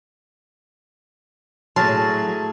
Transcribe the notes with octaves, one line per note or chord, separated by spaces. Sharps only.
A2 F#3 G#4 A5 C6 F6 A6